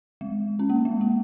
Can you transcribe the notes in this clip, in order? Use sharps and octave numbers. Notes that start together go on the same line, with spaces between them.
G#3
C#4
A#3
G#3
A#3